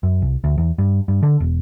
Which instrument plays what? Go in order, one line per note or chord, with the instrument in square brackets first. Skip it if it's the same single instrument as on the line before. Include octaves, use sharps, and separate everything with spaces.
[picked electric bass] F#2
C2
D2
E2
G2
G2
D3
E1